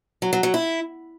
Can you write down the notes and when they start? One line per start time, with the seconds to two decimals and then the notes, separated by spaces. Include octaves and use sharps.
0.22 F#3
0.33 F#3
0.43 F#3
0.54 E4